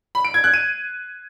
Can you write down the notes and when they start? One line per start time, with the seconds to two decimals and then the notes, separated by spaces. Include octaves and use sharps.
0.15 B5
0.25 D7
0.34 G#6
0.44 F#6
0.54 D#7